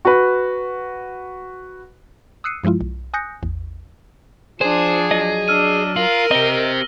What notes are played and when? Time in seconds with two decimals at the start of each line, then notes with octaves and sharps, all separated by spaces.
0.05 F#4 B4
2.44 D#6 E6 F#6 C7 C#7 D#7
2.64 G2 F3 G#3 E4 F4
2.81 B1
3.14 G#5 D#6 F#6 G6 A#6 C#7
3.43 A1 E2
4.61 F3 D4 G#4 C5
5.11 F#3 D#5
5.48 D4 E6 F6 D#7
5.96 F4 A#4 F#7
6.31 C4 G4 D#5 A#6 G7